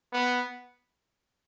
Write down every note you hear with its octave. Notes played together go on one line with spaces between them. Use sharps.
B3